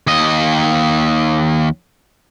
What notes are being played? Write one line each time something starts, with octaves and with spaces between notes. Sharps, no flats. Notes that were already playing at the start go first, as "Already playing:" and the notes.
D#2 D#5